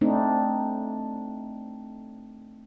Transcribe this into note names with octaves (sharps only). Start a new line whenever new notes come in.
A3 C4 D4 D#4